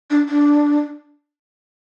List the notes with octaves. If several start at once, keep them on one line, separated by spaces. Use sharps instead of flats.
D4
D4